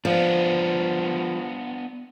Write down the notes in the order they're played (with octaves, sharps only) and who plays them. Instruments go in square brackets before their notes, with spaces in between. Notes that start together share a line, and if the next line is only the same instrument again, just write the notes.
[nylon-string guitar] F3 [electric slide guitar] B3 D4